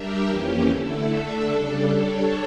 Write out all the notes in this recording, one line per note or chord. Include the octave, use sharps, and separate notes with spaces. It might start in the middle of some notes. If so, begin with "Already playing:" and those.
Already playing: G3 D4 G4 A#4 E5
F2 E3 A#3 C#4 G4
D3 A3 E4 A4
D3 A3 D4 A4 E5
C#3 G3 D4 A4
G3 D4 A4 C#5